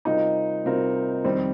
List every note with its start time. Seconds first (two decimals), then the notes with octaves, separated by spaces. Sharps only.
0.05 C3 G3 C4 D#4 F4 A#4
0.65 C3 G3 C4 F4 A#4
1.24 F2 D#3 G3 C4